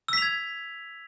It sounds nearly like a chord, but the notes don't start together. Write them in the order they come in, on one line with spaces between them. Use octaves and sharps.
E6 B6 F7 G#6